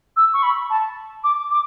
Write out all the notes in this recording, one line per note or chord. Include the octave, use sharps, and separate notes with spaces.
E6
C#6
B5
A5
D6
D6